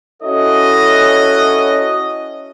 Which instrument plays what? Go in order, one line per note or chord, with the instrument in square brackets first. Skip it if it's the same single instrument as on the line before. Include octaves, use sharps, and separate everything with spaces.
[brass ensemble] C#4 E4 F#4 A4 C#5 D#5